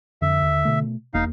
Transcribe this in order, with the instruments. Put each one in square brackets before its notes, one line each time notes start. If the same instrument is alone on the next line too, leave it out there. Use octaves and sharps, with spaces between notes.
[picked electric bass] F2 [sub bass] D3 [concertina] E5
[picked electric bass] D#2
B2 A3
[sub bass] E1 [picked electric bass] E2 A#3 [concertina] D#4 F5